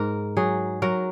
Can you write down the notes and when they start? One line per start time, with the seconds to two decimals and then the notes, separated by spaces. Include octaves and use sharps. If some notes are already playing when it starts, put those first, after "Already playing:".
Already playing: G#2 A#4
0.37 F#3 G#4
0.82 F#3 A#4